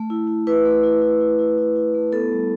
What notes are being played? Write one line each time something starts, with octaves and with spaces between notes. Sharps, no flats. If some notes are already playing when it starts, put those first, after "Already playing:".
Already playing: A3
E4
E4
E4 B4
A3
E4
E4
E4
E4
E4
E4
A3
B3 A4
G3